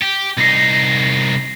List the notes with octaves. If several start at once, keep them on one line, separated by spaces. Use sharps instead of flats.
G4
C2 D#4 A#6 C7